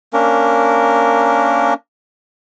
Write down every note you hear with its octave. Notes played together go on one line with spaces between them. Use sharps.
A#3 C#4 D4 A#4